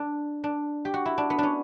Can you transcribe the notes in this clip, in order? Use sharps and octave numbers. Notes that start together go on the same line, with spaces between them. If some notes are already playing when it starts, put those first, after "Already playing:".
Already playing: D4
D4
G4
F#4
E4
D4
B3
C#4 D4